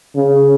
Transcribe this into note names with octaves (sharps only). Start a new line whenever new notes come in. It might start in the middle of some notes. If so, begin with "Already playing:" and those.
C#3